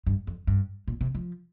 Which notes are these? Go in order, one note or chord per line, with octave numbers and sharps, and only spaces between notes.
G2
F2
G2
A#2
C3
F3